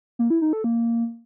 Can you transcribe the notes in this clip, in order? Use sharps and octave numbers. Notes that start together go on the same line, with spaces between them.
A#3
E4
D#4
A4
A#3